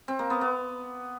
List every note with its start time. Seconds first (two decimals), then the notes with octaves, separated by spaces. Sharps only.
0.08 C4
0.19 A#3
0.30 B3
0.41 B3